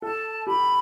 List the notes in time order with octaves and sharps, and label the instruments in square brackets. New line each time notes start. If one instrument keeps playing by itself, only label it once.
[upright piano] A4 [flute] A5
[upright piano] G4 [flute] B5